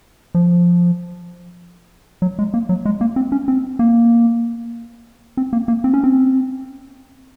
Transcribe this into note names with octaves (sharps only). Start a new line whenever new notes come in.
F3
F#3
G#3
A#3
F#3
G#3
A#3
C4
C#4
C4
A#3
C4
A#3
A#3
C4
C#4
C4